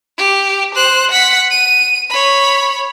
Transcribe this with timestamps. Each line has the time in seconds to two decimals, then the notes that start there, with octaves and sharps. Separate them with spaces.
0.18 G4
0.75 C5 F#6
1.11 F#5 B6
1.51 D#7
2.10 C#5 B5